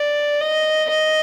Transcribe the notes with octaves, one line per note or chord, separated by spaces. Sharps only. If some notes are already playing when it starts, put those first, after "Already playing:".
Already playing: D5
D#5
D#5